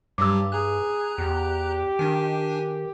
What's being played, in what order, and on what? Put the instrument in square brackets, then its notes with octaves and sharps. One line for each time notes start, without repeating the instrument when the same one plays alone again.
[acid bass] G2 [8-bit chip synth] F#3 G3 G4 [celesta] D6 E6
[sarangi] G#4 [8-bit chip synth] A#5 F#6
[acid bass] E2 [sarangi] G4
[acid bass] D#3 [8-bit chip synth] D4 G#5